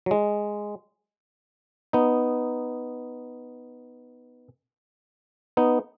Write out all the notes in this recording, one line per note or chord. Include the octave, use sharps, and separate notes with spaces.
F#3
G#3
B3 D#4
B3 D#4